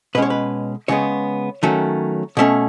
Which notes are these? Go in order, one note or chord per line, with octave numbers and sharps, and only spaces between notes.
B2 G#3 C#4 B4 C#5
B4
C#3 G#3 B3 C#5
D#3 F#3 A3 C#4
B2 A3 C#4